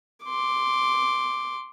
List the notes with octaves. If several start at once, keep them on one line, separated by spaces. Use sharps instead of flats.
C6 D6